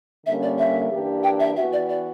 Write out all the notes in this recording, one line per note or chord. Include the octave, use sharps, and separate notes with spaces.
D3 G3 A#3 C#4 E5
D5
E5
G2 E3 A#3 D4 G4
G5
E5
E3 B3 F#4 E5
D5
D5